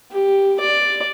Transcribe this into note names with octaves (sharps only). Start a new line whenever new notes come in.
G4
D5